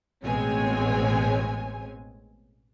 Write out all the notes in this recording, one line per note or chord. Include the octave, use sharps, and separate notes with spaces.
A1 B2 G#3 C4 C#5 G#5